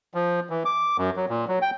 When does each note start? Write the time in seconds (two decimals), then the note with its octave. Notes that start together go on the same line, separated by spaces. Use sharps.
0.14 F3
0.50 E3
0.65 D6
0.98 F#2
1.16 F#3
1.29 A#2
1.48 F#3
1.62 G5